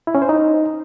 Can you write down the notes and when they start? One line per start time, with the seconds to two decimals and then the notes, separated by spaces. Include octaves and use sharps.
0.07 E4
0.15 C#4
0.22 C5
0.29 D#4